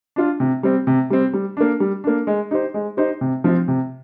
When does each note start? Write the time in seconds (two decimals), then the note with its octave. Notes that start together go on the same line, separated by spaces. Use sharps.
0.16 D4 F4
0.40 C3
0.63 G3 C4
0.87 C3
1.10 G3 C4
1.33 G3
1.57 A#3 D4
1.80 G3
2.04 A#3 D4
2.27 G#3
2.51 D#4 G4 C5
2.74 G#3
2.97 D#4 G4 C5
3.21 C3
3.44 F3 C4 F4
3.68 C3